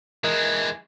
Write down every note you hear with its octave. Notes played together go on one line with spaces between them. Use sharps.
E3 G#3 A#4 D#5 F#6